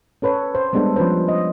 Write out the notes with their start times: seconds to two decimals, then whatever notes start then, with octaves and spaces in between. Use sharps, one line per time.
0.22 C#4 A4 B4 C#5
0.55 C5
0.73 G3 G#3 B3 D4 A4
0.96 F3 C#4 B4 C5
1.29 D#5